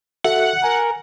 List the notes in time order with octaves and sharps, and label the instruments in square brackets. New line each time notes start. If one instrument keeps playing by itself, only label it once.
[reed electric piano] F#4 A4 E5 [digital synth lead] F#5
[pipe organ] A#4 [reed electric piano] G#5